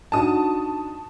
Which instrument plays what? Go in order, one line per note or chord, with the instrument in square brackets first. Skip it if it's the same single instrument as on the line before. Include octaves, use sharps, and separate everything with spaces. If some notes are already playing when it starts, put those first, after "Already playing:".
[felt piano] D4 D#4 F#4 [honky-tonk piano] A5 D#6